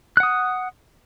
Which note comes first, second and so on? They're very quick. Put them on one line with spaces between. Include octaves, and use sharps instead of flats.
F#6 F#5 D#6